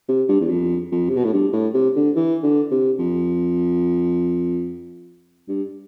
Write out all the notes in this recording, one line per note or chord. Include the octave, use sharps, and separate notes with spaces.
C3
G2
E2
F2
F2
C3
B2
A2
G2
A2
C3
D3
E3
D3
C3
F2
G2